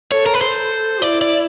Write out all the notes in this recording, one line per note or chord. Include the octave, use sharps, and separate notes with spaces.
A4 C#5
A#4
B4
A4 C5
E4 D5
D5